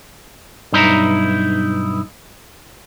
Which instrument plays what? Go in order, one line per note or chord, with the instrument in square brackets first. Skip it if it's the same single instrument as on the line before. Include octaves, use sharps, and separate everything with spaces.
[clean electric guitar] B1 G2 D#4 E4 A#5